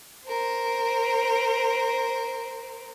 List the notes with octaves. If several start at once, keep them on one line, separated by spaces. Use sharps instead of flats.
A#4 C5